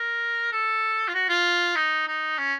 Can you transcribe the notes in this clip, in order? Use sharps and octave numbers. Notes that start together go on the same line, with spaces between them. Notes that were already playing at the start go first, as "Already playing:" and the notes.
Already playing: A#4
A4
F4
F#4
F4
D#4
D#4
C#4